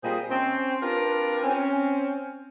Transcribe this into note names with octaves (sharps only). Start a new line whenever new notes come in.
A#2 G3 C4 G#4 C5 D#5
C4 C#4
C4 D4 F4 G4 A#4 B4
C4 C#4